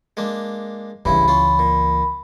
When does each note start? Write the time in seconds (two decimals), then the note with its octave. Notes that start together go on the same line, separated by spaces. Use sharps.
0.17 G#3 A#3 D4
1.05 C#2 G2 C#3 E3 E4 B5
1.28 C#4 F4
1.59 A#2